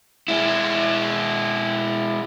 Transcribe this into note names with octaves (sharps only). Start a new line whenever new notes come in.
G#3 E4